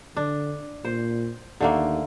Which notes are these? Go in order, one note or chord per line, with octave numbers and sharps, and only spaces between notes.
D3 D4
A#2 C5
D#2 D3 A3 A#3